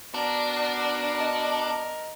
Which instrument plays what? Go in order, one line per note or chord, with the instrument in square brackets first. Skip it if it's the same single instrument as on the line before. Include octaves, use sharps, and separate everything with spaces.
[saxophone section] B3 F#4 D5 [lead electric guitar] D4 [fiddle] A#4
[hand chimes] D#5